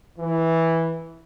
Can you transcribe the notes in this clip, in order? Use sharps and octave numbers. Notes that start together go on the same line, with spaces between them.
E3